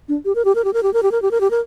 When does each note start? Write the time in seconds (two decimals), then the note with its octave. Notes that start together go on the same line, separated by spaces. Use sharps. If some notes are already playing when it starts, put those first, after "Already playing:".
0.08 D4
0.25 G4
0.35 A#4
0.45 G4
0.55 A#4
0.65 G4
0.73 A#4
0.83 G4
0.94 A#4
1.03 G4
1.12 A#4
1.22 G4
1.31 A#4
1.41 G4
1.51 A#4